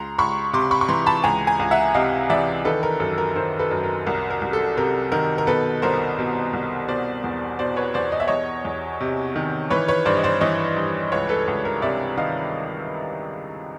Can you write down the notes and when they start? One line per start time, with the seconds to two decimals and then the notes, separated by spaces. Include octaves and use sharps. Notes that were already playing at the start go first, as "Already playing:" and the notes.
Already playing: C#2 A#5 C6
0.18 C#2 B5 C#6
0.53 C3 C6 D6
0.71 B5 C#6
0.81 C#6
0.89 E3 A#5 C6
1.06 A5 B5
1.24 C#2 G#5 A#5
1.47 G#5 A#5
1.59 C#2
1.71 E5 F#5
1.94 C3 D#5 F5
2.30 E3 D5 E5
2.65 D#3 A4 B4
2.83 A#4
3.00 F#2 A4
3.18 A#4
3.36 D#3 A#4 C5
3.59 A4 B4
3.71 F#2
3.83 A#4
4.06 C2 A#4
4.30 A#4
4.42 C2
4.53 A4
4.77 C3 A#4
5.12 D#3 A#4
5.38 A#4
5.47 B2 A4 B4
5.82 C2 A#4 C5
6.19 B2
6.53 C2
6.88 B2 C5 D5
7.24 E2
7.59 B2 C5 D5
7.76 B4 C#5
7.94 E2 C5 D5
8.12 D#5
8.20 E5
8.27 E2 C#5 D#5
8.65 E2
9.01 C3
9.36 D#3
9.70 E3 B4 C#5
9.88 B4 C#5
10.05 G2 C5 D5
10.17 D#5
10.24 C5 D5
10.41 E3 C#5 D#5
10.76 G2
11.12 C#2 B4 C#5
11.29 A4 B4
11.47 C#2 A4
11.65 A#4
11.82 C3 D5 E5
12.17 D#3 D#5 F5